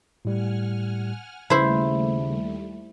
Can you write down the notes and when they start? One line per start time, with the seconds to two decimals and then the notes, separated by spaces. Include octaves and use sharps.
0.25 A2 G3 F#5 G#5 F6
1.50 D#2 C#3 G3 A3 E4 C5